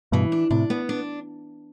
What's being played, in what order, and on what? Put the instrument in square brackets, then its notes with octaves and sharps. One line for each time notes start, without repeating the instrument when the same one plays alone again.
[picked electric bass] G2 B2 [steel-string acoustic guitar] E3
[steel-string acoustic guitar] D4
[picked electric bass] A2 C3 [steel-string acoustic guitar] D4
[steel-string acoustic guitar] B3
D4